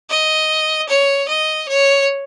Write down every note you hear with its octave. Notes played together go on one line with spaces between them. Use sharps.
D#5
C#5
D#5
C#5